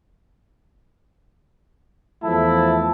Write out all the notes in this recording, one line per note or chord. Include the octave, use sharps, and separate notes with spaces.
E2 F3 A3 E4 A5